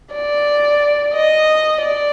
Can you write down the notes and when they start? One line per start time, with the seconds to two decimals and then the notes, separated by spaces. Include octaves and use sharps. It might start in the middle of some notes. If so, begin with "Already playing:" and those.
0.12 D5
1.14 D#5
1.81 D5